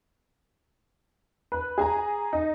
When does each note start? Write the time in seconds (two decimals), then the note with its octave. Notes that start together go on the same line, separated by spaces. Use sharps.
1.52 B4
1.78 G#4 G#5 A#5
2.33 D#4